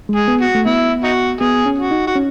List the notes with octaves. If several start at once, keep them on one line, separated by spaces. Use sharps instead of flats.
G#3
G#4
B3
F#4
A3
B3 E4
D#4 F#4
B3 G#4
C#4
F#4
D#4
F#4
C#4